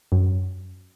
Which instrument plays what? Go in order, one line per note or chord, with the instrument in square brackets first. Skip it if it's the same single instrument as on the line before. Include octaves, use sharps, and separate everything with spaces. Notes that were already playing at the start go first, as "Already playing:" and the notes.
[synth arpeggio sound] F#2